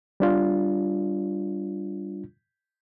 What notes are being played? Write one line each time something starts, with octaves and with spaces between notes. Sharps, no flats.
G3 D4 F4